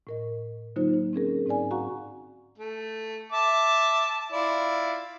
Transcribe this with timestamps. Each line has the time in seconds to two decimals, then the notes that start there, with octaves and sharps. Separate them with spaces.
0.07 A2 A#4 D#5
0.76 D3 F#3 A#3 D#4 F4 C5
0.93 D#4
1.13 C4 C#4 G#4 A#4
1.46 G#2 C4 D#4 D5 G#5
1.71 F#4 F5 F#5 A#5 C#6
2.58 A3
3.32 E5 A5 D6
4.32 E4 F4 D5